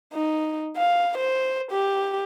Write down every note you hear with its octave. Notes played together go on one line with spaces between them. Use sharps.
D#4
F5
C5
G4